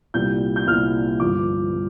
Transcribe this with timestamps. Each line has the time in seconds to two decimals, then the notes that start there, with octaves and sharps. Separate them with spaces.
0.14 C2 A#2 G3 G6
0.56 G6
0.67 C2 A#2 G3 F6
1.20 G1 G2 F3 D6
1.73 F3